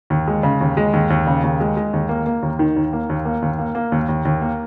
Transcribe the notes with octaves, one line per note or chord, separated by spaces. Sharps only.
D#2
G#3
C#3
D#2
G#3
D#2
D#2
C#3
D#2
G#3
G#3
D#2
A#3
A#3
D#2
D#3
D#2
A#3
D#2
A#3
D#2
A#3
A#3
D#2
D#2
D#2
A#3